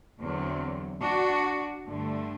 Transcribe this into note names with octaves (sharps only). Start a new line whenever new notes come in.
E2 D3 F#3 C4
D4 F#4
G2 D3 A3